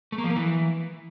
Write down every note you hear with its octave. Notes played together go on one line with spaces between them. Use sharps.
A3
A#3
F3
A#3
E3